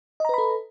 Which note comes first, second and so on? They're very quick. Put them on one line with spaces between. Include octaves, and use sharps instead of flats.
D#5 A#5 B4 B5 A4